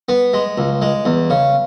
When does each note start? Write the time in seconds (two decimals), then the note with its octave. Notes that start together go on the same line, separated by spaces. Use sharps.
0.09 B3
0.34 G#3
0.58 C#2
0.82 G#3
1.05 E2
1.30 C#3